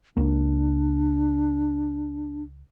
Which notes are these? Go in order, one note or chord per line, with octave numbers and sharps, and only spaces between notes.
C#2 A#3 D4